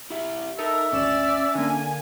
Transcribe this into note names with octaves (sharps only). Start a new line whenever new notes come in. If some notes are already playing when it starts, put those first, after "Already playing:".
E4 G4 E5
D#4 A4 A#4 E5
G#1 D2 C#4 D5 E7
D3 A#3 G#5